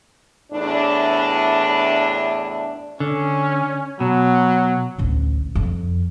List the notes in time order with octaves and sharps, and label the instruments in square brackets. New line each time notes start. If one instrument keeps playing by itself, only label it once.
[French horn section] E2 A2 D4
[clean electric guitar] D3 [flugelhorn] C#4
[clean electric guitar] B2 [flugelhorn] F#3
[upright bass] A1 D2
F2